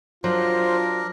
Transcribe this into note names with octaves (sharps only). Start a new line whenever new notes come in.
F#3 D4 F4 A#4 C5